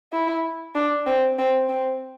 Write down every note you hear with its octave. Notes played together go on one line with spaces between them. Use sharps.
E4
D4
C4
C4
C4